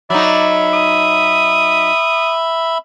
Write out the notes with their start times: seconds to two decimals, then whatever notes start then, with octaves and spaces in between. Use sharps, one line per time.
0.10 F#3 D#4 D5 E5 B5
0.73 D#6